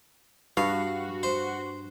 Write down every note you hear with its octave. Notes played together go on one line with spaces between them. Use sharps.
G2 F#4 F5
C5